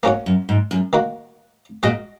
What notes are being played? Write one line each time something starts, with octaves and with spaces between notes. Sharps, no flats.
G#2 A#3 C#4 F#4 C#5
F#2
G#2
F#2
D#3 A#3 F#4
A#2 G#3 F#4 D#5